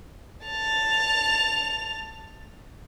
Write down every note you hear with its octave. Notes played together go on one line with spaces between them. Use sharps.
A5 F7